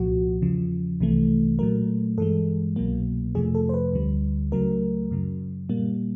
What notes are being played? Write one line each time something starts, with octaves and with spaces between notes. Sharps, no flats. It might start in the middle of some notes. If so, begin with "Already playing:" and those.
Already playing: C2 A#2 F3 F#4
E2 C#3 F3
C2 C3 E3 A3
A#2 F#3 A3 A#4
G2 E3 G#3 A4
C2 B2 F#3 A#3
F2 C3 F3 A3 G#4
A4
C5
B4
D2 D3 G3
C#2 C#3 F#3 A3 A#4
F#2 C#3 F#3
A#2 G3 A#3